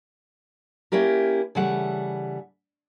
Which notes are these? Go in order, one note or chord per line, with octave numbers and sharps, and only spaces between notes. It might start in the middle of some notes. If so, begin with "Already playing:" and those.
A#3 C#4 E4 G4 A#4
C#3 E3 G3 A3 F#5